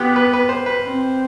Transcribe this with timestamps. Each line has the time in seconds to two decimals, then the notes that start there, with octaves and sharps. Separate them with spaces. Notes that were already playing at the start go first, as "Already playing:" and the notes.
Already playing: B3 F4 G4
0.16 B4
0.33 B4
0.49 C5
0.66 B4
0.84 C4